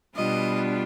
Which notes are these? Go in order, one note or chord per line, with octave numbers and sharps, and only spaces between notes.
B2 G3 B3 D4 F4 D#5